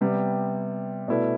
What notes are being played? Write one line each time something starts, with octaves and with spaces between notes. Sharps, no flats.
C3 G3 B3
B2 A3 E4 B4 D5